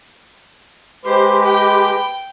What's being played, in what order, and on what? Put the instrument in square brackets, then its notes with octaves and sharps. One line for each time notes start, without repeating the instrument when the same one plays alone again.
[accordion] G#3 G4 [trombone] B4 [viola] C5
[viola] G5